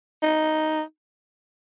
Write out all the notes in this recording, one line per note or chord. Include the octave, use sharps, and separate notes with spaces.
D#4